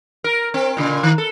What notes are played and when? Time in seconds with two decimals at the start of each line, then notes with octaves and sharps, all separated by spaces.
0.24 A#4
0.54 C4
0.77 A#2 C#3
1.03 D#3
1.18 A4